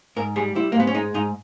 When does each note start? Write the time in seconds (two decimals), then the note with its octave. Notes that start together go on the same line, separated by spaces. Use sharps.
0.16 G#2 A#4
0.36 G3 G#4
0.55 G3 E4
0.72 A#3
0.75 G#2 B3
0.87 C#4
0.94 G#3 D#4
1.14 G#2 D#4